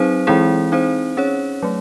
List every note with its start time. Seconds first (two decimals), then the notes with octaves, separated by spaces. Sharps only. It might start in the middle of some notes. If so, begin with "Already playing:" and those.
Already playing: F#3 C4 D#4 G#4 C5
0.27 E3 G#3 C4 E4 G#4
0.72 C4 D#4 G#4 C5
1.17 C#4 G#4 C#5
1.63 F#3 A3